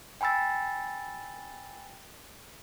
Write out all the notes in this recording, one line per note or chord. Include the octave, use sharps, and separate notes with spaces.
G5 G#5 B5 E6 A6